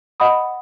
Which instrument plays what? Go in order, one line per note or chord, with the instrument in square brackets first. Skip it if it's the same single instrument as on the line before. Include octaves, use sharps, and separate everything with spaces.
[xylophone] D#5 F#5 B5 D#6